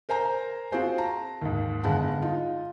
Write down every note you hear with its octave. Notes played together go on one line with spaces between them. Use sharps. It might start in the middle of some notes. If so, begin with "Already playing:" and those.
A#4 C5 G#5 A#5 G6
C4 F4 F#4 G#4 C5 G#5
A5 A#5
D#2 G#2
G1 G#3 F5 F#5 A5
D#4 F4